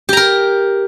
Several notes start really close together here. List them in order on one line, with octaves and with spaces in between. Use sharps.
G4 A#5 A#4